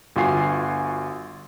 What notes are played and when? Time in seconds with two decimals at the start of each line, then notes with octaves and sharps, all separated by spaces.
0.16 G1 F4 F#4 G#5 C7